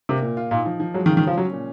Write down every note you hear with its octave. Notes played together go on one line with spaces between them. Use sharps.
C3 A#3
A#2
F4
A#2 D#4
F3
F3
F#3 G#3
D#3
C#3
D#3
F3 C#4
F#3 C#4
A#2